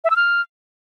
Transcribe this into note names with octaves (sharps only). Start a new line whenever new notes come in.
E5
E6
F6